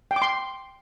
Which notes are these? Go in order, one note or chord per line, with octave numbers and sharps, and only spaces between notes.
G5
D6
C6